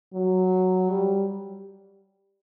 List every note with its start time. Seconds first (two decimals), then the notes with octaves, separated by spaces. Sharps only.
0.14 F#3
0.89 G3